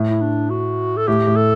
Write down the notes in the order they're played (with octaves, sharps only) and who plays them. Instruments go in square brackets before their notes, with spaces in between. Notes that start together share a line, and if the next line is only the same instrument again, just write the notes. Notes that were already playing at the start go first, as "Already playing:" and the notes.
Already playing: [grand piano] A2
[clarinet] E4
D4
F#4
A4
[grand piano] A2 [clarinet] G4
[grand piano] A2
[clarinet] A4